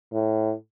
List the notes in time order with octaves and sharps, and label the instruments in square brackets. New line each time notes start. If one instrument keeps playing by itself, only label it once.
[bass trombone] A2